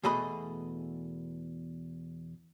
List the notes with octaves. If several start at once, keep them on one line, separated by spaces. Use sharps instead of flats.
E2 B2 A3 G#4 D#5 B5